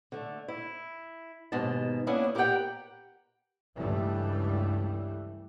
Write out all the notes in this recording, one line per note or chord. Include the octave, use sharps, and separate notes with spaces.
D3 A3
E4
D#2 G#2 B2 G#3 A5
A#3 B3 C#4 D4 E4 G#4
G4 A#4 B4 C#5 F#5 G5
C#2 G2 E3 G3 A3